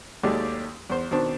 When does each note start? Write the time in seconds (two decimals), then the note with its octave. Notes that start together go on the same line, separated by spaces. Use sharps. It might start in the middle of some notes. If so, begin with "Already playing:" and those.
0.23 D#2 F#3 G#3 A3 G4 D5
0.90 E2 C5
1.11 B2 D#3 C4 D4